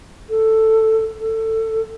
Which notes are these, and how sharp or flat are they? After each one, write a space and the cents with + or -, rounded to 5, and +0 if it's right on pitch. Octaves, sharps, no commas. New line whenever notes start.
A4 +5
A4 +20